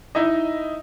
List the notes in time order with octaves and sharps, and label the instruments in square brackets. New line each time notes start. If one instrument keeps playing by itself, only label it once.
[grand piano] D#4 E4 D#5